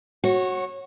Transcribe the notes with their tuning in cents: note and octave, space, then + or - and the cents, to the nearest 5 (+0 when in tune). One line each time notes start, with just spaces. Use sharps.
F#4 +0 C#5 -25